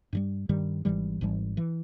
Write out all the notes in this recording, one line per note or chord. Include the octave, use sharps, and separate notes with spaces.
G2 D#3 G3
G2 D#3 G3
G#1 G#2 E3 G3
G#1 G#2 E3 G3
E3